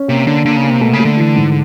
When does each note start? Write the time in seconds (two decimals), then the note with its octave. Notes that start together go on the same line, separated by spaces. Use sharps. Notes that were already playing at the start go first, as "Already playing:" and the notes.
Already playing: C#4
0.08 C3 A#3
0.27 D3 D4
0.45 D3 A#3
0.56 C#3
0.64 A#3
0.70 C3
0.81 B2 A3
0.93 C#3
1.00 A3
1.05 D3
1.17 E3
1.36 G#2